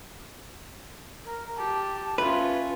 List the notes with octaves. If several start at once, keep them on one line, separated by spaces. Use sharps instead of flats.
A#4
G4 A5
C#4 F4 B4 E5